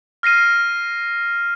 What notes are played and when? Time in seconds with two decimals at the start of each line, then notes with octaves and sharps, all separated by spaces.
0.23 F6 A#6 C7 D#7